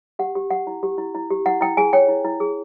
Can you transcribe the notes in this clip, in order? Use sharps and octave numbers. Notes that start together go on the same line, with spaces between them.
G4 F#5
G4
G4 F#5
E4
G4
E4
E4
G4
E4 F#5
E4 G5
G#4 G#5
C#5 G5
E4
E4
G#4